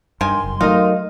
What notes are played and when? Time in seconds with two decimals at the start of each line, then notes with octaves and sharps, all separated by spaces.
0.21 G2 D#3 G#5 C6
0.44 F#1
0.61 F#3 G3 A3 D#4 A#4 D#5 F5